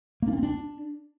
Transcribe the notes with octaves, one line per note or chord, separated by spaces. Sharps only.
A#3
D4
C#4
C4
D4